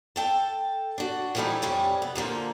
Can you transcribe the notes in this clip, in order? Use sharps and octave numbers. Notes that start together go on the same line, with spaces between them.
A4 G5 A5
D4 F#4
E3 F3 G3 A3 D#4 E4
F2 C3 G3 C#4
B3
A#2 D3 F3 A#3